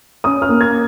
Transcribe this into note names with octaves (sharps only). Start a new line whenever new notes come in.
C#4 D#6
F6
A#3
G#6